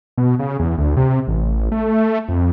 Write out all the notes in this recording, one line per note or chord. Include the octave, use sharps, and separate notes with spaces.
B2
C#3
E2
D2
C3
A1
A3
F2